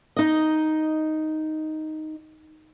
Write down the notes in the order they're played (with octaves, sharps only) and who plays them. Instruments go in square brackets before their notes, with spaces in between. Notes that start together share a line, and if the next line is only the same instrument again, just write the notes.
[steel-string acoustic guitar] D#4 D#5